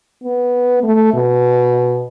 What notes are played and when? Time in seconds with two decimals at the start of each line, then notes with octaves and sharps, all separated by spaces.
0.23 B3
0.83 A3
1.14 B2